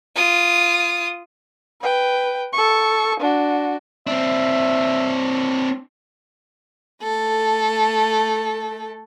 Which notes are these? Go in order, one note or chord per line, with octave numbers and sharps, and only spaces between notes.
F4 D#6
B4 G5
A4 C#6
D4 F#4
C4 D4 E5
A3 A4